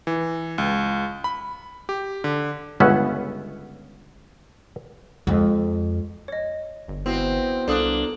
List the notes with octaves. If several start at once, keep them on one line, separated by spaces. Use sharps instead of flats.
E3
C#2
B5
G4
D3
G1 C#2 B3 C#4 E5 F#5
F2 G#3
C#5 D#5
G1
B3 C4 E4 F#4
C2 A#3 D4 A4 D#6 F#7